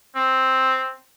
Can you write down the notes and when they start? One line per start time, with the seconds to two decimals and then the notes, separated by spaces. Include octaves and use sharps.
0.15 C4